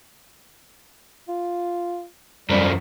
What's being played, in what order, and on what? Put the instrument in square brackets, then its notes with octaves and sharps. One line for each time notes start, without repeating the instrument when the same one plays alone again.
[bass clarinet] F4
[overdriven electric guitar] F#2 F3 [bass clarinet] G3